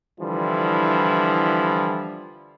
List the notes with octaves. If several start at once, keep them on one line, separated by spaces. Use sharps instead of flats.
D3 E3 F3 G3 E4